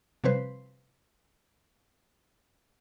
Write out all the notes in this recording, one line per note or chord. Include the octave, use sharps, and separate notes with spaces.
C3 F3 G3 C4 B4 C5